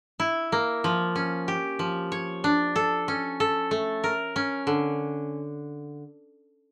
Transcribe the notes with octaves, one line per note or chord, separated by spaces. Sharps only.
E4
A#3
F3
C#4
G4
F3
C#5
D4
A4
C#4
A4
A3
A#4
C#4
D3